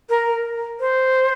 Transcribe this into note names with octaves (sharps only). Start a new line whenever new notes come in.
A#4
C5